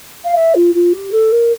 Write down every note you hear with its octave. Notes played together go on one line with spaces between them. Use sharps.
F5
E5
F4
F4
G4
A4
A#4